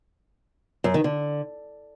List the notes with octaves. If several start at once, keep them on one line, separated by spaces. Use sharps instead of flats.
F#2
D#3
D3